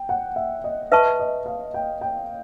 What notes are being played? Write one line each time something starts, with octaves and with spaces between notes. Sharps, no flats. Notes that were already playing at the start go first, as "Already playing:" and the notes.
Already playing: G5
F#5
E5
D#5
B4 D#5 E5 A5 C#6
D#5
F5
G5
G5